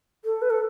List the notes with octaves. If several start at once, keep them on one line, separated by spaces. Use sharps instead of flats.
A4
B4
A4